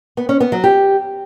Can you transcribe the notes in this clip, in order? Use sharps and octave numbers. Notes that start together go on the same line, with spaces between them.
B3
C#4
B3
F#3
G4